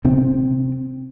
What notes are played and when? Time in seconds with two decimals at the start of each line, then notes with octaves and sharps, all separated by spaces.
0.05 C3 C4